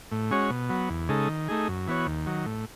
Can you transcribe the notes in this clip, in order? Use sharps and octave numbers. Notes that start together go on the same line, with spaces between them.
A2
G#3 C#4 F#4 C#5
B2
F#3 B3
E2
C#3 G#3 D#4 A4
D#3
A3 D#4 G#4
F#2
E3 B3 F#4 C#5
D#2
D#3 F#3
A2